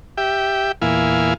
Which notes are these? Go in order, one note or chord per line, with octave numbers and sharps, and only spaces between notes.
G4 E5 G5
E2 A#2 E4 F5 G#5